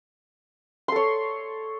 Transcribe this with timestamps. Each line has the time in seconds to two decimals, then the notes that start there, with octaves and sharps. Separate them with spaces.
0.88 C6
0.92 A4
0.96 C#5